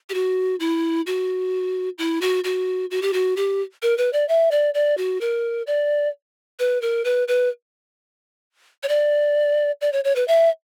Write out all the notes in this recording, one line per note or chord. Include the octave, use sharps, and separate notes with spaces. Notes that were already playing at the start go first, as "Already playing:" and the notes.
G4
F#4
E4
F#4
E4
F#4
F#4
F#4
G4
F#4
G4
A#4
B4
D5
E5
D5
D5
F#4
A#4
D5
B4
A#4
B4
B4
C#5
D5
D5
C#5
C#5
B4
E5